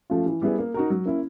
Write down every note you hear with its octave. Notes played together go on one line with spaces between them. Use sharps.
F3 A3 C#4 F4
E3
G3 B3 E4 G#4
A#3
D#4 F#4 A#4
F#3
A#3 C#4 E4